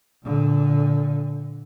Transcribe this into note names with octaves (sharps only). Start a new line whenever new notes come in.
A#2 D3